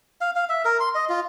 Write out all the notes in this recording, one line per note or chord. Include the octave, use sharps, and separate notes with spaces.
F5
F5
E5
A#4
C6
D#5
F4